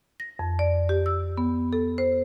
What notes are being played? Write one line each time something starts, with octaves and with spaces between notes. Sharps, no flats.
A#6
F2
D5
G4
E6
B3
A4
C5